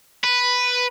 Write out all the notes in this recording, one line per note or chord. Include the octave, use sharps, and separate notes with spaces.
B4